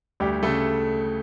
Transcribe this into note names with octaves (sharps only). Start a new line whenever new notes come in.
D2 G3 G4
C#3 A3 A4